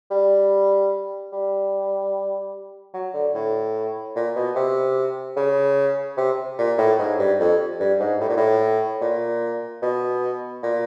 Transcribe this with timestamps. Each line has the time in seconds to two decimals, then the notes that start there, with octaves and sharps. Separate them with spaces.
0.11 G3
1.33 G3
2.94 F#3
3.14 D3
3.34 A2
4.16 A#2
4.36 B2
4.56 C3
5.36 C#3
6.17 C3
6.58 A#2
6.78 A2
6.99 G#2
7.19 G2
7.40 F2
7.80 G2
8.00 G#2
8.20 A2
8.29 A#2
8.37 A2
9.01 A#2
9.82 B2
10.63 A#2